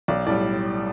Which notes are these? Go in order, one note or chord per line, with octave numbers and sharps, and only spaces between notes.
B1 D5
A2 G3 D5